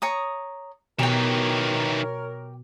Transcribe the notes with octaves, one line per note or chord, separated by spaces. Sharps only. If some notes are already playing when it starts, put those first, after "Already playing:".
C#5 A#5 D#6
B2 D#3 E3 G4 A#4 C#5 G5